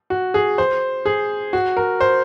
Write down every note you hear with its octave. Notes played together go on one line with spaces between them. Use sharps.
F#4
G#4
C5
G#4
F#4
A#4
C5